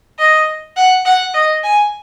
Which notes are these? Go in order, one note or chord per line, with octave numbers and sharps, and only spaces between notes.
D#5
F#5
F#5
D#5
G#5